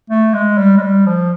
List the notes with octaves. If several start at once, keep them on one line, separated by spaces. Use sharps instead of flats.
A3
G#3
G3
G#3
G3
F3